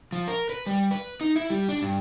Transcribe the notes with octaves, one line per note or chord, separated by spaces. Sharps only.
F3
A#4
B4
G3
B4
D#4
E4
G3
D4
G2